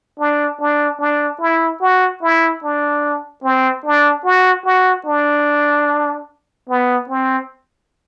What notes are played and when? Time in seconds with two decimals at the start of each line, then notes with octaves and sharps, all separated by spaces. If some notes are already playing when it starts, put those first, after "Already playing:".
0.20 D4
0.60 D4
1.00 D4
1.41 E4
1.81 F#4
2.22 E4
2.63 D4
3.44 C4
3.85 D4
4.25 F#4
4.65 F#4
5.06 D4
6.69 B3
7.09 C4